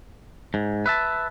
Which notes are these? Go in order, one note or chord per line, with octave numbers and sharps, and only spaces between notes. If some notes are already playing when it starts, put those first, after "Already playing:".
G#2
B4 E5 A5